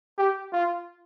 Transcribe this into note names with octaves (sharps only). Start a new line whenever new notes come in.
G4
F4